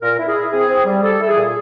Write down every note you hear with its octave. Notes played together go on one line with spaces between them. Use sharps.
A#2 A#4
E4
G#4
E4
C4 G#4
C4
G3
G3 A4
E4 A4
G#4
A#2